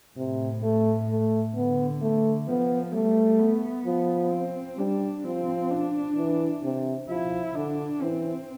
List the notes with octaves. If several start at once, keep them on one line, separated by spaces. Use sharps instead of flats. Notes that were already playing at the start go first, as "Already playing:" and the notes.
A2 C3
A3
A3
D3 B3
A3
F3 B3
G3 A3
B3
F3
C4
G3 D4
F3 C4
D4
E3
C3
F3 E4
D3 D4
E3 C4